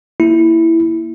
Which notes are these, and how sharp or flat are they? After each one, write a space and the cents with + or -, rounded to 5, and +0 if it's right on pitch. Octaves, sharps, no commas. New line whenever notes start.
A#3 +0 E4 +0